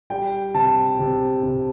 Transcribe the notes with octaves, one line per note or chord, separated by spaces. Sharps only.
G3 G5
C3 A5
C3
C3